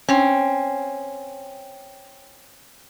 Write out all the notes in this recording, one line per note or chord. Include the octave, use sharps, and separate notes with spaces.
C4 C#4